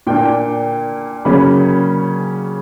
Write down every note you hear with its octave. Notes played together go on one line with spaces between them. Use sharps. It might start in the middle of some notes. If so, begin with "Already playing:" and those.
A#2 A#3 D4 G5
C#3 F#3 A#3 C#4 B5